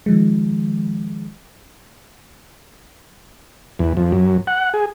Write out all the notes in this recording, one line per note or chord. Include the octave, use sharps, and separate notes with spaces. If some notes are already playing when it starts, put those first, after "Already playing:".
D#3 F3 G#3
E2
F2
F#2
F#5
G#4